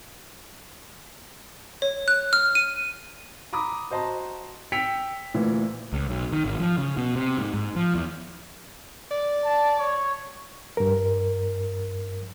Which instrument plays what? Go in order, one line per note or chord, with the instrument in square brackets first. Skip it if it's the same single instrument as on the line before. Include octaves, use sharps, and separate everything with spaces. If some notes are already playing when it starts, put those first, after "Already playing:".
[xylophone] C#5
F#6
F6
D#7
[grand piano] A#5 B5 D6 D#6
F#4 C5 D#5 A5 A#5 C6
G5 E6 B6 C#7 F7
D2 A#2 E3
[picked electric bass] C#2
B1
D#3
G#1
F3
C#3
B2
C3
G#2
G#2
F3
E2
[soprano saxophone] D5
[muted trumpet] A5
C#5
[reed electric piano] G2 A#4